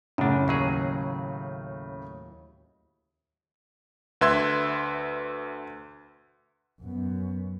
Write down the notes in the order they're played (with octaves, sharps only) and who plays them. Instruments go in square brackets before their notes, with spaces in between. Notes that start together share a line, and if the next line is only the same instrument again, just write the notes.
[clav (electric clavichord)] F#2 D4 [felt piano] A2 C#3
[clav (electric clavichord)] D#2 F#3 G#4
[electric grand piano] D2 B4 E5 C6 G#6
[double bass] F#2 B3